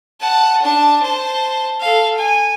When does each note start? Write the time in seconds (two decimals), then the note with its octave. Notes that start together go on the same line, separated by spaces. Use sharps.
0.20 F#5 A5
0.62 D4 A5
1.03 C5 A5
1.81 A4 F5
2.18 G#5